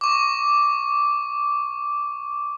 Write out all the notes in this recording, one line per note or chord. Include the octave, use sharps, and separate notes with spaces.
C#6 D6